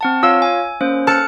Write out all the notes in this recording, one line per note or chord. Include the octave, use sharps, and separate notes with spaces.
C4 F#5 A5
F4 C#5 F5 E6
G#5
A#3 C#4 C5
A4 A5 F6 F#6 C#7